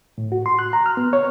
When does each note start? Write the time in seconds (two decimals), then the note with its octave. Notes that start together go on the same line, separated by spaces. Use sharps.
0.18 A2
0.32 F#4
0.46 C6
0.59 F#6
0.73 A#5
0.86 F6
0.97 B3
1.13 C#5